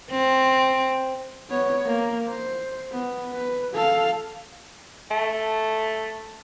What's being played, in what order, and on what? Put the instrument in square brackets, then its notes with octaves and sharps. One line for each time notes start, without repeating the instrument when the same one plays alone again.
[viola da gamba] C4
[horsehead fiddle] B3 C#5
A#3
C5
B3
B4
A4 F5
[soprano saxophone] A3